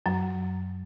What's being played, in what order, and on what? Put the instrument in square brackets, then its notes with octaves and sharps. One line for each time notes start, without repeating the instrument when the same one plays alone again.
[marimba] F#2 F#3